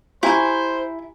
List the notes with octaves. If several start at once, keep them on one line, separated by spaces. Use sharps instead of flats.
E4 G4 C5 G#5 A#5